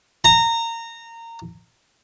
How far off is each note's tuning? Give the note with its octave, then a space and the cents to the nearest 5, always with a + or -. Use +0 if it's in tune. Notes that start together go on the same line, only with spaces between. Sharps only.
A#5 -20